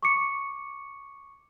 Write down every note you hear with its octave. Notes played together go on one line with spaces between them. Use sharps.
C#6 D6 C#7